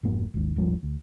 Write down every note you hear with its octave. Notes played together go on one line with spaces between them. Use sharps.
F1 G#2 A#3
G#1 D#2
D#1 G#1 F3 G3
D2